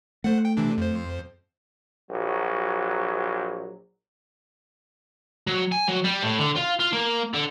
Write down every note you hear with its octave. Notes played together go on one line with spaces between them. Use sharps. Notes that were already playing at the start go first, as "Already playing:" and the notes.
A3 C5 F#5
G5
C3 E3 D4
F2 C5
A#1 F#3
F#3
G#5
F#3
G3
A2
D3
F4
F4
A#3
D3